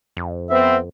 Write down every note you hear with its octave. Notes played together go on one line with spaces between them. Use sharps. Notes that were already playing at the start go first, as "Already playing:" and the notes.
F2
B3 C4 E5